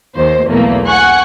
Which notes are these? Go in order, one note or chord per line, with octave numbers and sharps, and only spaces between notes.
D#2 C5
B1 E2 A3 A#3
F#5 G#5 C#6 F#6